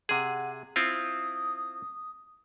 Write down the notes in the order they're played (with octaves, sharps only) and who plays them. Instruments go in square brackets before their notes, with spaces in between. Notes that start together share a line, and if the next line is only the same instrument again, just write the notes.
[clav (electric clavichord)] C3 G#4 [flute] F#5
[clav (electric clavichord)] C4 E4 F4 [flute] D#6